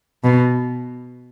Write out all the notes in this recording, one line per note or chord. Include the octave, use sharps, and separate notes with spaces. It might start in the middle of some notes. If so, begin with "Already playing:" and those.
B2